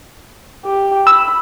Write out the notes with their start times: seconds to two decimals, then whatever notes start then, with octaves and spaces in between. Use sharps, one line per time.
0.65 G4
1.07 B5 E6